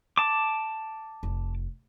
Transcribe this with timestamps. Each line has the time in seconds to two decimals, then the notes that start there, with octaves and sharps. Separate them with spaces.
0.18 A5 D6
1.23 F1